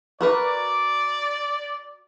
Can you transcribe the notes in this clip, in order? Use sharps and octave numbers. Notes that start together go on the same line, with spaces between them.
F#4 A#4 B4 D5